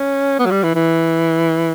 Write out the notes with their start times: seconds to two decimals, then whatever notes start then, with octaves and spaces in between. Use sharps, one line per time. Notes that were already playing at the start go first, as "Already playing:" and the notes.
Already playing: C#4
0.39 B3
0.46 F#3
0.51 G3
0.63 E3
0.75 E3